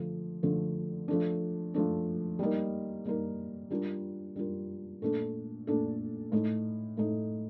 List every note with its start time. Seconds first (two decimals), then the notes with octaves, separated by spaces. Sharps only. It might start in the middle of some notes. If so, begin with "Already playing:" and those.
Already playing: D3 F3 A3
0.43 D3 F3 A3
1.08 F3 A3 D4
1.74 F3 A3 D4
2.39 G3 A#3 D#4 A#4
3.05 G3 A#3 D#4 A#4
3.70 G3 D4 F4 A#4
4.36 G3 D4 F4 A#4
5.02 A#2 A3 D4 A4
5.67 A#2 A3 D4 A4
6.32 A2 A3 D#4
6.97 A2 A3 D#4